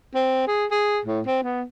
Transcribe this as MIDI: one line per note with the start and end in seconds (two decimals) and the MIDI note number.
0.15 0.47 60
0.47 0.66 68
0.71 1.00 68
1.05 1.21 45
1.27 1.42 60
1.43 1.64 59